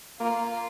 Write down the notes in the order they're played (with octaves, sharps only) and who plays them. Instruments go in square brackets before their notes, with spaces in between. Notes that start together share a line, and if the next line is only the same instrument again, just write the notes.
[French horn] A#3 [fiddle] F4